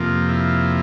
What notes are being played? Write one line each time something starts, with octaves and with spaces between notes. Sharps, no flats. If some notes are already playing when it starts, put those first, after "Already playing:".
Already playing: F2 C3 F3 A#3
E4